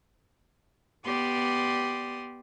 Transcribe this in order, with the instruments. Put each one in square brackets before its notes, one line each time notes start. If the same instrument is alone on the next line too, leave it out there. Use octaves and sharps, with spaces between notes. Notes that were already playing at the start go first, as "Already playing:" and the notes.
[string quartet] B3 G4 D5 C6 D#6